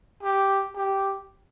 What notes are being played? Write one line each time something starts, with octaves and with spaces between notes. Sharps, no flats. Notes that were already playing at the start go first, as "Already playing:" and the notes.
G4
G4